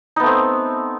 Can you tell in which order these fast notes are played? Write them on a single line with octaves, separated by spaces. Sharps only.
D#4 B3 A3 C4